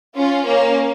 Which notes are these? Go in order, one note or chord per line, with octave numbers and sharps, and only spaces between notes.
C#4 F4
A#3 C#4